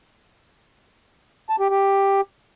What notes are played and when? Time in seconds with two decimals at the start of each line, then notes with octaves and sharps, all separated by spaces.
1.49 A5
1.60 G4
1.70 G4